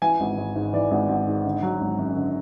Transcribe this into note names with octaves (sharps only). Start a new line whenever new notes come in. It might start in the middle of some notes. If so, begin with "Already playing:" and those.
E3 G#5
G#1
G#1
G#2
E3 D5
G#1
G#1
G#2
D3
F#3
G#1
F#2
D3